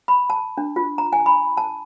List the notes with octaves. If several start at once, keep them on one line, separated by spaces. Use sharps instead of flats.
B5
A5
D4
F4
A#5
G#5
B5
A5